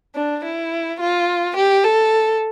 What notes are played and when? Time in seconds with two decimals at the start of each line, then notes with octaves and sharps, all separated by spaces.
0.15 D4
0.44 E4
1.01 F4
1.57 G4
1.84 A4